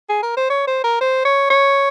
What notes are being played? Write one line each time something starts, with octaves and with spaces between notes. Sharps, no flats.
G#4
A#4
C5
C#5
C5
A#4
C5
C#5
C#5